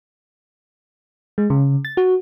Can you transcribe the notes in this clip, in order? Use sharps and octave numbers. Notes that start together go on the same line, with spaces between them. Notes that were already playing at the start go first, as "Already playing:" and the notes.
G#3
C#3
A6
F#4